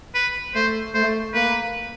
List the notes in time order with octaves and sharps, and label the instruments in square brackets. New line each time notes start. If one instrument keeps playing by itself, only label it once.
[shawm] B4
[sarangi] A3 [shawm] C5
[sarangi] A3 [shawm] C5
[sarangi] A#3 [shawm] B4